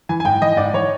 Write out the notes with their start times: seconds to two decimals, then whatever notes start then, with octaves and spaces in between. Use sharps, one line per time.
0.09 E3 G#5
0.20 G#5
0.25 G#2 G5
0.42 E3 D#5
0.57 G#2 D5
0.73 E3 C#5